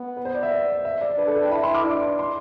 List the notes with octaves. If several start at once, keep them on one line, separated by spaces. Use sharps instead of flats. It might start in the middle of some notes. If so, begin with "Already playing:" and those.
Already playing: B3
B4
C5
D5
E5
D5
E5
D5
D4 B4
A4
B4
G5
E4 B5
C6
D6
D4
C6